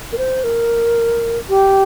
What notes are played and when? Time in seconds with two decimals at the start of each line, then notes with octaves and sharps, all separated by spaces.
0.12 A#4
0.18 C5
0.44 A#4
1.49 G4